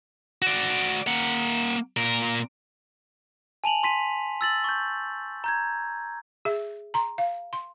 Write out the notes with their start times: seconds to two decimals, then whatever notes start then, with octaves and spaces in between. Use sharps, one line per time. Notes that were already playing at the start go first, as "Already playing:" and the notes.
0.42 F#4 D5
1.07 A#3 F#5
1.97 A#2 A#4
3.64 G#5 A5 F7 F#7
3.83 C6 B6 D#7
4.41 E6 A6 F#7
4.64 C#6 G6
5.44 A#5 G6 G#6
6.45 G#4 E5
6.94 A#5 C6
7.18 F5
7.53 C6